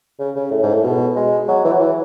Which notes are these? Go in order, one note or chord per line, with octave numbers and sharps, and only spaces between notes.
C#3
C#3
A2
G#2
A2
B2
G#3
F#3
E3
F#3
E3